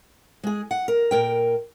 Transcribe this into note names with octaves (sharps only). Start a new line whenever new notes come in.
G#3 G#4
F#5
A#4
A#2 A#4 G5